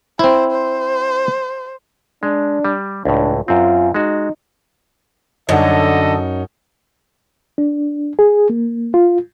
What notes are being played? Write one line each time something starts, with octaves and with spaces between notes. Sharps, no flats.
C4 E4 C5
C5
G#3 D4
G3
C#2 A2 D4
F#2 C4 F4
G#3 D#4 F#4
F#2 D3 C#4 D#4 A4 D#5 A5
D4
G#4
A#3
F4